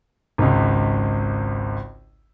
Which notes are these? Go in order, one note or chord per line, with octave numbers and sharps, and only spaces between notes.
G#1 C#2